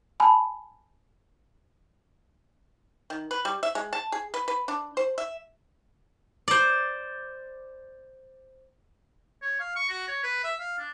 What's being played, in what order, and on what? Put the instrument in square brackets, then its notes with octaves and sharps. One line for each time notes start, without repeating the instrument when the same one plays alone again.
[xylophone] G#5 A5 B5
[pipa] D#3
B4
G3
E5
G#3
A5
G#4
B4
B4
D4
C5
E5
[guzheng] C5 D5
[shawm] C#5
F5
C#6
F#4
C#5
B4
E5
F5
D4